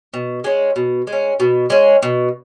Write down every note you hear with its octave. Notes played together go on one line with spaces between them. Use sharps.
B2
G#3 C#4
B2
G#3
C#4
B2
G#3 C#4
B2